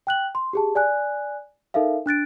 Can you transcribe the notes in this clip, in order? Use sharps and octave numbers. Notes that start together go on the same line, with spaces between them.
G5 F#6 F#7
C6
G4 G#4 A5
D5 G#5 F#6
D#4 A4 A#4 E5 F5
D4 F#6 A6 D7